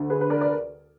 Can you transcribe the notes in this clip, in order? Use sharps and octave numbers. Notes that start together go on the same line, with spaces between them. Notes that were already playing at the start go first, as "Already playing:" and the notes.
Already playing: D2 D3
G#4 B4
B4
A#4 D5
D5